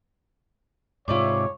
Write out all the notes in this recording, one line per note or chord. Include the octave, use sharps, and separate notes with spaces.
G#2 C3 E4 F4 C#5 D5 D6